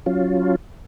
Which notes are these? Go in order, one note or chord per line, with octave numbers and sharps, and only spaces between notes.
F#3 C#4 F4